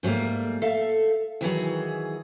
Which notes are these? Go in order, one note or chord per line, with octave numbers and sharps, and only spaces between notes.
G#2 F#3 G3 A3 A#3
A4 E5 F5
D#3 E3 F#3 G#4